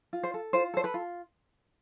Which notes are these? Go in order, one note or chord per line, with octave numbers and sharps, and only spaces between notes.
F4
C5
A4
F4 C5
A4 C5
B4
F4